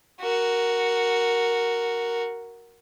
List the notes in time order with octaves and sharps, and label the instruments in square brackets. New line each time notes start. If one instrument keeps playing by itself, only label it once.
[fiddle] F#4 A#4